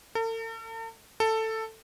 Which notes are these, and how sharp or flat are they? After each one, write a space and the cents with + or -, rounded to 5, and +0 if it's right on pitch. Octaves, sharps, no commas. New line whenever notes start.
A4 +45
A4 +10